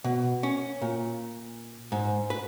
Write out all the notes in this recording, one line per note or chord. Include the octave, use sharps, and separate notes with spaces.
B2
C#4
A#2
G#2
B4